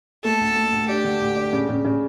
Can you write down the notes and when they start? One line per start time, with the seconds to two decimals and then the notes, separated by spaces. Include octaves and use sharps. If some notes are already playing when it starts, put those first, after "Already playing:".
0.24 A3 A4
0.40 D2
0.56 A3
0.72 D2
0.88 D4 G4
1.04 D3
1.21 D2
1.36 D4
1.53 C#3
1.69 C#3
1.84 C#3